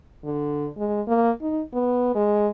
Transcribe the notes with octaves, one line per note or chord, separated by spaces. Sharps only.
D3
G#3
A#3
D#4
B3
G#3